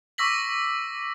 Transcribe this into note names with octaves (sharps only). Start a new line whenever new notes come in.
C#6 D6 E6 A#6 B6 F#7